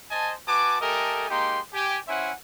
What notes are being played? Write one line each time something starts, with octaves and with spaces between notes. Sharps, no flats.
C5 D#5 G#5 A5
F#4 B4 G#5 A5 D6
A3 G4 A4 A#4 D#5 G#5
G#3 A#3 D#4 G4 G5 C6
G4 G#5
C#4 E4 C5 E5 F#5 G#5